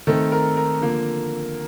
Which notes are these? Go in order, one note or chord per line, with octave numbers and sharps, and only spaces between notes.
D#3 A3 C4 A4
A#4
A#4
D3 F3 A#3